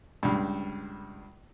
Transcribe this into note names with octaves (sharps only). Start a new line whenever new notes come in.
C#2 G2